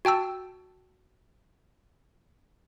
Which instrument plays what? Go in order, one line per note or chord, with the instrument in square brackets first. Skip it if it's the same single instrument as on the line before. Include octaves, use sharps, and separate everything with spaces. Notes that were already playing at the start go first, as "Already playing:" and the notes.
[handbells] F#4 G5 A5 E6